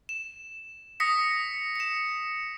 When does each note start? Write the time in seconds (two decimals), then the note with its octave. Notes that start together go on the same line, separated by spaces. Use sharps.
0.09 E7
1.00 D#6 A#6 B6 C#7
1.75 C#7 E7